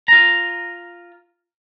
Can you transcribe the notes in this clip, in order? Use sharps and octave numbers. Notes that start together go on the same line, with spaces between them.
F4 A#5